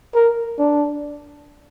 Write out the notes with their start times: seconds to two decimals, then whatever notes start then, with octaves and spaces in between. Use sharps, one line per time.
0.15 A#4
0.59 D4